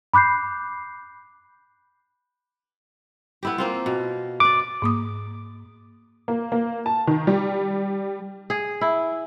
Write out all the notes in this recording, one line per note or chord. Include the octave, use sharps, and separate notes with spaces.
B5 D6 F#6 G6 C7
B3 E4 G4
A#3 C4 F4
B2
B4 D5 D6
G#2 A#3 D#6
A#3
A#3
A5
D#3
G3
G#4
E4